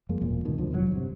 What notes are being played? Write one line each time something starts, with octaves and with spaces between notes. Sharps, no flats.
F#2 F3 G#3 A#3
E1 A#2
D2 G#2 B2 D#3
C2 D3 F3
E1 C2 A#2 F#3
G1 C3